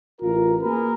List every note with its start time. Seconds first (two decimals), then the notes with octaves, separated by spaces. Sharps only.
0.21 A1 F4 A#4
0.62 A#3 F#4 G#4 A#4 B4